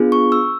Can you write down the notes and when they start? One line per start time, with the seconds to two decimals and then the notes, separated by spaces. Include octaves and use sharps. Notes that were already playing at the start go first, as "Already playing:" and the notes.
Already playing: B3 D4 F4 G#4
0.12 C#6
0.32 E6